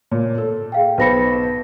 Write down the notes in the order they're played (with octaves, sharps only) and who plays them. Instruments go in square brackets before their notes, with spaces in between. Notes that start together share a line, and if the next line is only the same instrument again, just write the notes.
[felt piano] A#2 [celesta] C#5
[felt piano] A4
[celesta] G#4 F5 G5
[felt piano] B1 C5 B5 [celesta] B4 A#6 C#7